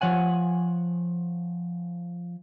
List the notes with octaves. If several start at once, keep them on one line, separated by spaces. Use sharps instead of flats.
F3 C#5 F#5 G#5